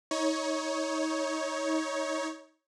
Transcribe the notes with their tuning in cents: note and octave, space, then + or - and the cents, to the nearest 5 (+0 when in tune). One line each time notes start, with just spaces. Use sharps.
D#4 +30 C#5 +0